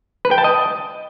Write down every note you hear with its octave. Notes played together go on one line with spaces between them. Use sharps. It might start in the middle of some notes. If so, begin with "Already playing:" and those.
B4
G5
A5
D#5